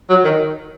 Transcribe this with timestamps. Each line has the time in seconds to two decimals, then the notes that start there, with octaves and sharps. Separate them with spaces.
0.10 F#3
0.24 D#3